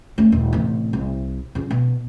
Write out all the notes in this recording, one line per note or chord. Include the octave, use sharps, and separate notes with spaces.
A3 C#4
D#1
A1 C3
C2
C#3 F3
B2